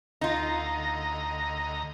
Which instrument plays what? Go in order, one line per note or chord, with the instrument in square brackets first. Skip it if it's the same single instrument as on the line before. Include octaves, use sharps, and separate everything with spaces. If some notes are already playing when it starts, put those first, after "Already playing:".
[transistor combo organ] D2 D#5 A#5 [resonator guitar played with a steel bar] D#4 F4